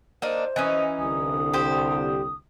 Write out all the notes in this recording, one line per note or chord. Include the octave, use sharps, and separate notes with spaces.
A#3 D4 D#4 C5
E3 C#4 D#4 D#5
C2 D3 D#6
G4 C5